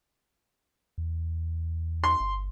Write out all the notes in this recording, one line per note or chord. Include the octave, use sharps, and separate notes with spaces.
E2
C6
G1